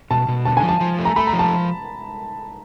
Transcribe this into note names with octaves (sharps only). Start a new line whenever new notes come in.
B2 A5
B2
D3 A5
G#5
F3
A5
F3
A3
A#5
A3 B5
A#5
F3
A5